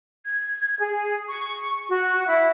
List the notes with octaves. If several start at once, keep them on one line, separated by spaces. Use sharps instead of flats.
G#6
G#4
C#6
F#4
E4